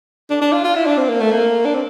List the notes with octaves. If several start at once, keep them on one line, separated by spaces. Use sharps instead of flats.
D4
D4
F4
F4
E4
D4
C4
A#3
A3
A#3
D4
C4